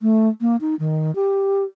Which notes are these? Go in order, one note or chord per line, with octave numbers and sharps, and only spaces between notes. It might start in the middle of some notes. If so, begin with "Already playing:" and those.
A3
A#3
D#4
D#3
G4